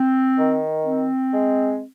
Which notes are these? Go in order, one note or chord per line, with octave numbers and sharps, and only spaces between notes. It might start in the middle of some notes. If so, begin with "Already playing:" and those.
Already playing: C4
D#3
C4
G#3